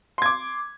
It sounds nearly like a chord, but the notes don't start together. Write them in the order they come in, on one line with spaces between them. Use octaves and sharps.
C6 G#6 D6